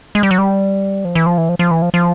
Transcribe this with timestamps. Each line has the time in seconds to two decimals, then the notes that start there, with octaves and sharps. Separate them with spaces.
0.15 G#3
0.23 G3
0.31 F#3
0.38 G3
1.05 F3
1.15 E3
1.26 F3
1.38 E3
1.49 F3
1.59 F3
1.71 E3
1.82 F3
1.94 F3